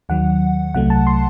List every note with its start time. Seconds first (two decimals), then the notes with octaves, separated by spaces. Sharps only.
0.09 D#2 D#3 F#3 F#5
0.74 C2 C3 F#3 A3 F#5
0.90 A5
1.07 C6